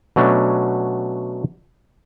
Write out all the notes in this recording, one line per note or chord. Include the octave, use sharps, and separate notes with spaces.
B2 F#3 A3 C#4 D4